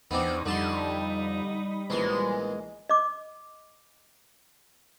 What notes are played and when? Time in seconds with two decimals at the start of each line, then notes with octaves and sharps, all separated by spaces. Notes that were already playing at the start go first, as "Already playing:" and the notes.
0.11 E2 B3 C4 D4 D#4
0.46 F2 D3 G3 D#4 A5 B5 C6
1.90 A#1 E2 G#3 C6
2.90 D#5 D6